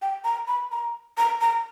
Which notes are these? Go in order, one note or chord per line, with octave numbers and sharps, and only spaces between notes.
G5
A#5
B5
A#5
A#5
A#5